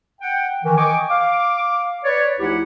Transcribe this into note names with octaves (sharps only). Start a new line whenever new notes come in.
F#5 G5
D#3 E3
D#5 G5 G#5 C#6 D6
F5 D6
B4 C#5 D5
D2 F3 D#4 E4 G4 F#5